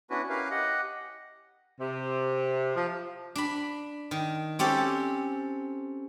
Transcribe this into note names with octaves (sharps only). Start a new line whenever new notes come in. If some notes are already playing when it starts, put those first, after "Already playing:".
B3 C#4 D4 E4 F#4 B4
C#4 E4 G4 A#4 B4 F5
G4 D#5 F#5
C3
F3
D4 B5
D#3
C4 C#4 G4 A4